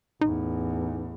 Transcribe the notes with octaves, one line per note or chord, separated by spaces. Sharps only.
A1 E2 D#4